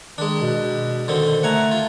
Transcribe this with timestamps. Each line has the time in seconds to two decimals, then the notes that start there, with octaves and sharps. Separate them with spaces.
0.18 D#3 G#3 D4
0.42 B2
1.08 D3 D#3 C4
1.43 A3 F#5 G#5 A#5
1.71 F4